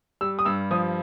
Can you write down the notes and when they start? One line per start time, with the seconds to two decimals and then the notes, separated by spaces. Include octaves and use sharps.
0.21 G3 E6
0.39 D#6
0.45 G2 E6
0.71 F3 D#6